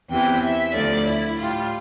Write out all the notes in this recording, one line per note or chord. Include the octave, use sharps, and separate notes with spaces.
E2 C3 E3 G5
E5
D2 D3 F3 D5
E4
A2 G3 F4